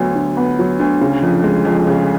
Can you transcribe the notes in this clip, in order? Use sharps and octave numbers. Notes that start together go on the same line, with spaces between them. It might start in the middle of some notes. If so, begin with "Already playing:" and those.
Already playing: D2 D3 F#3 B3
D3
B3
F#3
D2
C#3
F2
G#3
F2
C#3